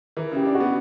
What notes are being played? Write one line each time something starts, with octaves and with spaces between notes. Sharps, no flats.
E3 A#4
C#3 G4
D4
F#4
B3